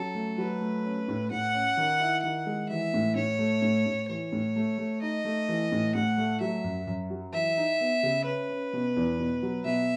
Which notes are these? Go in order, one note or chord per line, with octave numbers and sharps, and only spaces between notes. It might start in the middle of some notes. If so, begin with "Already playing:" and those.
Already playing: F#3 C#4 A4
A3
F#3 B4
A3
C#4
A2
A2 F#5
C#4
D#3
E4
D#3 F#5
G#3
E3 E5
A2
A2 C#5
A3
A2
A2
E3 C#5
A2
A3
A3
D#4 D#5
A3
E3
A2
A2 F#5
A3
F#3 E5
F#2
F#2
F#3
E3 E5
D#4
B3
C#3
C#4 B4
C#4
B2
E2
B2
F#3
B2 E5